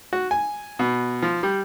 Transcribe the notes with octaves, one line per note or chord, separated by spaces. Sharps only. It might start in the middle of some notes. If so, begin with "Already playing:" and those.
F#4
G#5
B2
F3
G3